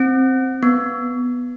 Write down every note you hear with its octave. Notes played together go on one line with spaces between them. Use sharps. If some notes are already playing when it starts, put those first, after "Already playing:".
Already playing: C4
B3